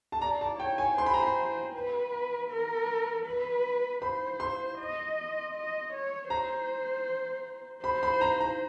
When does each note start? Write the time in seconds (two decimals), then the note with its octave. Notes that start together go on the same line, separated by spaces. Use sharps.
0.12 A5
0.21 D5 A#5
0.41 A5
0.59 C#5 G5
0.78 G#5
0.98 C5 C6
1.06 B5
1.14 A#5
1.23 B5
1.74 B4
2.50 A#4
3.26 B4
4.02 C5 B5
4.40 C6
4.79 D#5
5.55 D#5
5.93 C#5
6.30 C5 A#5
7.83 C5 B5
8.03 B5
8.21 A#5
8.40 A#5